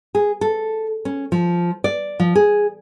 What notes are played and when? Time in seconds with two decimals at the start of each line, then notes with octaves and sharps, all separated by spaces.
0.15 G#4
0.41 A4
1.05 C#4
1.32 F3
1.84 D5
2.20 F3
2.35 G#4